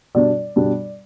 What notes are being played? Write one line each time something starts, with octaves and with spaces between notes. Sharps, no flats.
B2 G3 D4 D5
B2 G3 D4